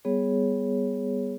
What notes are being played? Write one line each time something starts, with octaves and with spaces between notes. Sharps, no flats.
G3 B3 G#4 C#5